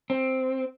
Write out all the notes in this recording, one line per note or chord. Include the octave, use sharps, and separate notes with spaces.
C4